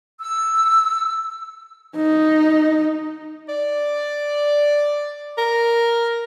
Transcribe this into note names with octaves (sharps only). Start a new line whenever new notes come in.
E6
D#4
D5
A#4